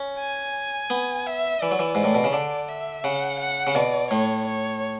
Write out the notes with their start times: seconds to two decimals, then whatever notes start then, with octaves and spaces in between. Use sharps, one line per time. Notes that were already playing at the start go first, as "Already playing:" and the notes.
Already playing: C#4
0.19 G#5
0.90 B3
1.27 E5
1.61 E3 D5
1.71 F#3
1.79 E3
1.95 G#2 D5
2.04 A2
2.15 B2
2.24 C#3
2.33 D3 D5
2.68 E5
3.04 C#3 F#5
3.40 F#5
3.67 C#3
3.75 B2 D5
4.11 A2 C#5
4.47 C#5